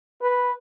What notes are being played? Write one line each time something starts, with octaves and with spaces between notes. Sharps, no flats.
B4